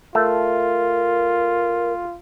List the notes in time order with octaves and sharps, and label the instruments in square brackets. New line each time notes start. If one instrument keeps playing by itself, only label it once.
[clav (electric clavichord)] A3 [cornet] F4 [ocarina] A#4